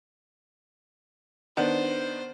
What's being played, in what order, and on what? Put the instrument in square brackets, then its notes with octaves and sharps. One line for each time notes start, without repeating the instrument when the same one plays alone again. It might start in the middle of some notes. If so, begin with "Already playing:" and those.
[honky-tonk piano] D#3 B3 D4 [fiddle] C5